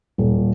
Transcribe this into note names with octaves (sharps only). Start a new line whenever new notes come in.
D#1